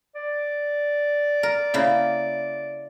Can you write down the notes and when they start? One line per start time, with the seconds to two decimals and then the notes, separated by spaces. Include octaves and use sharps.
0.15 D5
1.43 A#4
1.74 C#3 A#3 E4